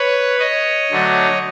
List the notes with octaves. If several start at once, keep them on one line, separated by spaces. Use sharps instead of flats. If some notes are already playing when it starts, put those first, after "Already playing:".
Already playing: B4 C#5
C#5 D#5
D3 F#3 A3 D4